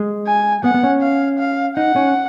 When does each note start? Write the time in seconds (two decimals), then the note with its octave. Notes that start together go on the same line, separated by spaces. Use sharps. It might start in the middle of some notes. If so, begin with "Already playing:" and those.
Already playing: G#3
0.27 G#5
0.64 B3 F#5
0.74 B3
0.83 C#4
1.02 F5
1.39 F5
1.77 D#4 F#5
1.96 C#4